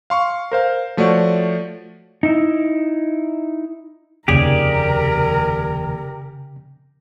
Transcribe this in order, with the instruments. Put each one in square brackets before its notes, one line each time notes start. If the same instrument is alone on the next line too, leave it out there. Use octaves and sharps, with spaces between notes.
[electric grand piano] F5 C6 C#6
A#4 C5 F5
F3 A3 F#4 C#5 D5
[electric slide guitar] D#4 E4
[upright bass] F1 D#2 [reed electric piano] C#3 [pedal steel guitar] G4 G#4 D5 [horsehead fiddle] A#4 A#5